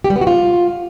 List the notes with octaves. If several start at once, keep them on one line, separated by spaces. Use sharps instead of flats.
G4
G3
B3
F#4
F4